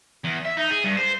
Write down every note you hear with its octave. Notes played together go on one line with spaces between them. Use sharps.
E2
E5
D#4
G#4
G2
C5